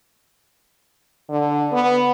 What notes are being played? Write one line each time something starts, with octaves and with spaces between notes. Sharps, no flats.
D3
B3